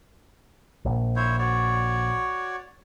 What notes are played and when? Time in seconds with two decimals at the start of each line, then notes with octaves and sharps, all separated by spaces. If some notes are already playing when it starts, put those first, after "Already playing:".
0.85 A#1
1.16 E4 C5 C#5
1.39 F#4 C#5 D5